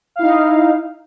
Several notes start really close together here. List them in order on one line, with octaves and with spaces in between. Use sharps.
F5 E4 D#4